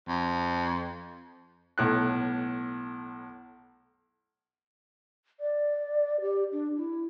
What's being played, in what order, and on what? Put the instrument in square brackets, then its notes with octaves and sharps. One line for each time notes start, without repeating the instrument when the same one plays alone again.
[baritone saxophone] F2
[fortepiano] B1 A2 F#6
[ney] D5
G4
D4
E4